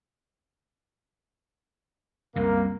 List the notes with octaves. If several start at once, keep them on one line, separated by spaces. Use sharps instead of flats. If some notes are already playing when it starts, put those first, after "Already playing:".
C2 F#2 C3 A#3